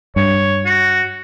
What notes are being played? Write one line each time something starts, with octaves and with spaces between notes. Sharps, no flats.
G2 C#5
F#4